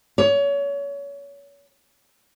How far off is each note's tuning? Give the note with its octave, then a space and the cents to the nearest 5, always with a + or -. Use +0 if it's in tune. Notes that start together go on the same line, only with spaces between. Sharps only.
C#5 +30